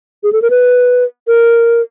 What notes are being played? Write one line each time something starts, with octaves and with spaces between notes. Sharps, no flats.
G#4
A4
A#4
B4
A#4